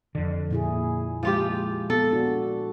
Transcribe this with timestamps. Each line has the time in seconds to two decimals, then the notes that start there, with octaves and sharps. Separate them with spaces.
0.15 F2 D3
0.51 A#2 E4 G#4
1.23 F3 G#3 F4 G4
1.90 B3 A4
2.12 D4 F#4